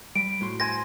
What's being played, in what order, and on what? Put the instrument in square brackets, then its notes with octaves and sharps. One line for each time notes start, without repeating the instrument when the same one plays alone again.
[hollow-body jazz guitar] G3 [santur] B5 [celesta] D7
[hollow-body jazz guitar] A2 F#4 C6
[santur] C5 G#5 [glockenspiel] A#6